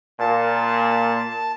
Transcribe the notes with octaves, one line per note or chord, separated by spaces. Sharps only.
A#2 A5